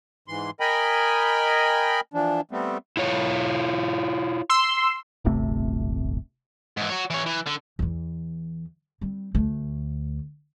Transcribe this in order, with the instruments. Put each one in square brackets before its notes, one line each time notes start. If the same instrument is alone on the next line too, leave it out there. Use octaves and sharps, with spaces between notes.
[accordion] G#2 E3 C6
A#4 D#5 G5 G#5 B5
E3 F3 D4
G3 A3 B3 C4
[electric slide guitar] E4 F4 C#5
[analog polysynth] C6 E6
[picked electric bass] D1 G1 C3 A3
[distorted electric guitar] G#2 E3
F#4 C#5
E3 C#5
E3
D3
[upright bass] E2 E3
G3 C4
D2 A3